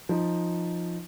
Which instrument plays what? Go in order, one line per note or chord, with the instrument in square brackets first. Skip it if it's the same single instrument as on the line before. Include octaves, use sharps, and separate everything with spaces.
[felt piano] F3 D#4